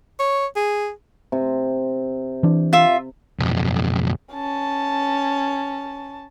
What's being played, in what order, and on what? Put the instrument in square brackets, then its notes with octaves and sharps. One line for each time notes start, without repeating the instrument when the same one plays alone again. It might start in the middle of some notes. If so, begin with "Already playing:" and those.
[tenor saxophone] C#5
G#4
[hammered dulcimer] C3
[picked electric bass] E3 D4
[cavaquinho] F4 E5
[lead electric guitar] B1 F2
[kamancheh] C#4 A5